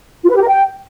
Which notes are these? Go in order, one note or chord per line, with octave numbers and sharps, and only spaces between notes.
F4
B4
G4
A#4
G5